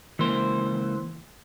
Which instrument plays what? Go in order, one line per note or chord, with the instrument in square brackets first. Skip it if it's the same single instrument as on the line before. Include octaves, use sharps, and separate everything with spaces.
[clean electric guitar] C#2 A#3 C5 [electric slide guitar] E3